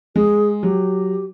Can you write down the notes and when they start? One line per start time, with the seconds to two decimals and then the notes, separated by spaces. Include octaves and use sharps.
0.16 G#3 G#4
0.63 F#3 G4